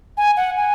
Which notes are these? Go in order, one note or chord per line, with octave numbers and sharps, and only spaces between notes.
G#5
F#5
G#5